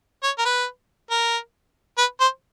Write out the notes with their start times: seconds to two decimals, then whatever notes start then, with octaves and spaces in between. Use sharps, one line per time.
0.23 C#5
0.39 A#4
0.45 B4
1.11 A#4
1.98 B4
2.20 C5